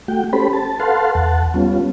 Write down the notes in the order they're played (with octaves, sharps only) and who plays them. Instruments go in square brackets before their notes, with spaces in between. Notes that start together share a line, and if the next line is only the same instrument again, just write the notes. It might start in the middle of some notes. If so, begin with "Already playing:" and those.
[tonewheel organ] A3 F#4 G5
C#4 G4 A4 C5 B5
A5
A4 B4 F5 F#5 A5 C6
E2 F#5 A5
G3 B3 C#4 F4